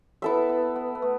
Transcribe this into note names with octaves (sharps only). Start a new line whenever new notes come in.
B3 E4 A4 E5
B3
B3
B3
A3